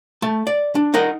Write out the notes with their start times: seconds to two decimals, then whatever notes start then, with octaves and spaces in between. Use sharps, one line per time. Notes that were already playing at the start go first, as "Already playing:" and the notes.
0.22 A3 A5
0.47 D5
0.75 D4
0.94 D#4 A#4 D#5 F#5